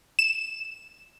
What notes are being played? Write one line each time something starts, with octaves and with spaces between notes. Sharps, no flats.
E7